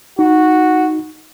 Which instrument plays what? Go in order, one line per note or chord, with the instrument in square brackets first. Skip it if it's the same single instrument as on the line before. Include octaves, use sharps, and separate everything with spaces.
[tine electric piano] D#4 [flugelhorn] F#4